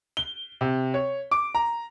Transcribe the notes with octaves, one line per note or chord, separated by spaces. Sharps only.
G7
C3
C#5
D6
A#5